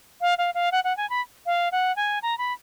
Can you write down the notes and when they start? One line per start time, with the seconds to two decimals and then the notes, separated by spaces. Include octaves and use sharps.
0.21 F5
0.38 F5
0.54 F5
0.72 F#5
0.84 F#5
0.97 G#5
1.10 B5
1.46 F5
1.72 F#5
1.96 G#5
2.22 A#5
2.38 B5